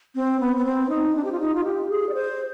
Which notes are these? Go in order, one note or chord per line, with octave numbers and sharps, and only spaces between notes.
C4
B3
B3
C4
D#4
D4
G4
F4
D#4
F4
G4
G#4
D5
C5